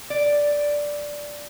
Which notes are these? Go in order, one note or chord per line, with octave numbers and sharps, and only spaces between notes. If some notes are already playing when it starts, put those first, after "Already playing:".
D5